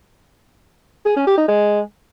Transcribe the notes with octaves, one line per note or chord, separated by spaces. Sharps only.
G#4
C#4
G4
D#4
G#3